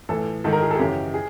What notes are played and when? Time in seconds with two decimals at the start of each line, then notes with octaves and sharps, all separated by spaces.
0.09 A2 E3 A4
0.44 G#2 D#3 A4
0.53 A#4
0.62 G#4
0.70 A4
0.75 G#4
0.79 F#2 C#3 E3 G4
1.14 G#4